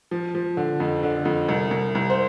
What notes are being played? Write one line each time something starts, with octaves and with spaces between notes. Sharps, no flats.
F3
F3
D3
F2
D3
F2
C2
C2
C2
C5